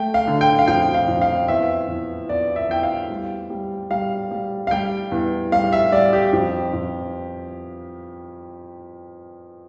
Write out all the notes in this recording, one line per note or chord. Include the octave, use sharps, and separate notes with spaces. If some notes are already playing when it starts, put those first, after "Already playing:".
Already playing: A3 G5
F5
D3
G5
F5
F2 G5
F5
F2
F5
E2 E5
E2
E2 D5
E5
E2 G5
F5
G3
G3
G3 F5
G3
F5
G3 G5
E2
G3 F5
E5
G3 D5
G4
F2
F2